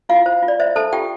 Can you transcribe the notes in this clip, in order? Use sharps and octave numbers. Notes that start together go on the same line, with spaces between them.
E4 F4 F5
C5
F4
D5
C5 E5
A4 C5 A5
F4 G4 G5